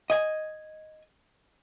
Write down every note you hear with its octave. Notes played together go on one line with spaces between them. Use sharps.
D#5 G#5